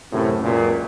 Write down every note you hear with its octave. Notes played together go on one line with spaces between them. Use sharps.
F#2 A2 C3
C#2 F#2 A#2